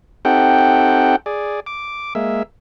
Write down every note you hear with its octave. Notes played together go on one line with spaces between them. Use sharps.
C4 D#4 G4 A4 F#5 G5
G#4 D5
D6
G#3 A#3 E5